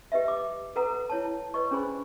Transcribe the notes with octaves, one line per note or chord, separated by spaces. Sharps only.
G4 B4 D#5 E5
D6
A4 B4 F#5 A#5
E4 C#5 A5
B4 D5 D#5 C#6
C#4 D4 G#4 C5 B5